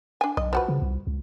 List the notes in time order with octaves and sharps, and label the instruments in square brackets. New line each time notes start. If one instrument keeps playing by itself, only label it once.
[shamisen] D4 G#5
[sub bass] B1 [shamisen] D#5
[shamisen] F3 F#4 B4
[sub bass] C#3
C2
C#2